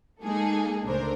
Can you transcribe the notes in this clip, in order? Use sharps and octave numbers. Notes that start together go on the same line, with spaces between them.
G#3 A#3 D#4 G#4 A4
C#2 D3 A3 D4 A#4 C5